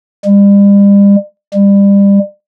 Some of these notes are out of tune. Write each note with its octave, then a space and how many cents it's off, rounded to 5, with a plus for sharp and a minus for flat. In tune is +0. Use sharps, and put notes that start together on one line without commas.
G3 +40
G3 +30